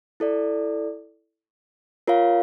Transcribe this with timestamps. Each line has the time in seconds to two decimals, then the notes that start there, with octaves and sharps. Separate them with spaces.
0.20 E4 A4 D5
2.07 F4 A#4 C#5 F5